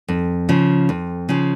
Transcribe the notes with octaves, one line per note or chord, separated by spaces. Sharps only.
F2
C#3 F3
F2
C#3 F3